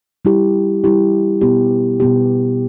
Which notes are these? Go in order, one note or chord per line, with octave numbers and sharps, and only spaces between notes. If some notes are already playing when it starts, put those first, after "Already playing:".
G3 E4 G4
G3 E4 G4
B2 B3 G4
B2 B3 G4